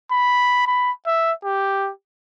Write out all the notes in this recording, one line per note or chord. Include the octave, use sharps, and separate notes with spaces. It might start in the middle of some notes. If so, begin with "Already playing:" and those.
B5
B5
E5
G4